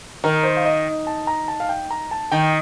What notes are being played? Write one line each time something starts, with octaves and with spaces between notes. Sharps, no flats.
D#3 A#4
C5
F5
D#5
A5
A#5
A5
F5
G5
A#5
A5
D#3 G5